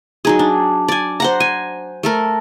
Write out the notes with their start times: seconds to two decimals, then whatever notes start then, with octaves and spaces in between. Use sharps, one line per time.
0.25 F#3 D#4 G#4
0.39 D4
0.88 D5 G#5
1.20 C5 F#5 A#5
1.40 G#5
2.03 A3 A4 A#4